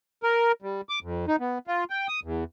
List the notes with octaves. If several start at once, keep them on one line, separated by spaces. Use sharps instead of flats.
A#4
G3
D6
F2
D#4
B3
F4
G5
D#6
E2